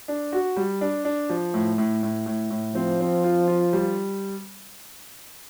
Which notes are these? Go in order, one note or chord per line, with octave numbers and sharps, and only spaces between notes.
D4
F#4
G3
D4
D4
F3
A2
A2
A2
A2
A2
F3 C4
C4
F4
F4
G3